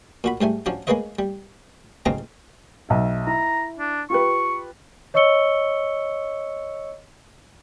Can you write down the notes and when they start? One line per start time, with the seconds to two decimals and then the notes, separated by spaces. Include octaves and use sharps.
0.24 A#2 F#4 B5
0.41 G#2 G3 A3 G#5
0.66 F3 F#3 C#4 D4
0.87 G#3 A#3 G#4 B4 C#5 D#5
1.19 G3
2.06 B1 G#2 C#3 C4 D#5 A#5
2.89 B1 E5
3.27 E4 A#5
3.78 D4
4.10 F4 G4 B4 C#6
5.14 C#5 D#5 C#6 E6 C#7 G7